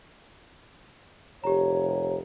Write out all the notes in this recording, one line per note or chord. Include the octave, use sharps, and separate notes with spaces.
F1 G4 C#5 A#5